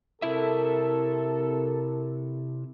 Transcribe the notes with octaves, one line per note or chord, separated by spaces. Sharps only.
C3 E4 A4 A#4 E5